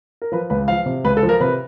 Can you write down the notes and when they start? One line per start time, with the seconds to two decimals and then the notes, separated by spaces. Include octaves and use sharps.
0.22 A#4
0.32 F3 B4
0.50 C#2 B4
0.68 F3 F5
0.86 C3
1.04 C#2 B4
1.17 A4
1.23 F3
1.29 A#4
1.40 C3 B4